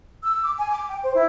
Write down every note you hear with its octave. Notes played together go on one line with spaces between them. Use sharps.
E6
D6
G#5
D6
G5
C5
E4